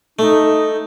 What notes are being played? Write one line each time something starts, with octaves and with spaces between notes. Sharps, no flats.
A3 D#4